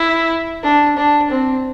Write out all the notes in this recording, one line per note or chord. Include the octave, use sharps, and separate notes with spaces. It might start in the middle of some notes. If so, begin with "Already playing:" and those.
Already playing: E4
D4
D4
C4